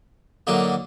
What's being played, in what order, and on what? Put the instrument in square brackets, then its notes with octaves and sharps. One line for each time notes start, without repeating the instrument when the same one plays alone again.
[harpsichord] D3 F#3 A#3 D#4